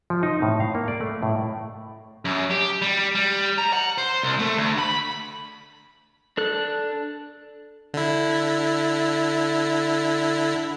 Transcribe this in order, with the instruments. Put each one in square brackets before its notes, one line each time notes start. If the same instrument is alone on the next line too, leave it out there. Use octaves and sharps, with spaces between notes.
[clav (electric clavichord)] F3
D#4
A2
F5
A#3
D5
A3
A2
[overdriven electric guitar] F#2
G4
G3
G3
A#5
F#5
C5
C2
A3
D2
B5
[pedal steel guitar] D4 A4 F#6
[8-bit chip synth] D3 E4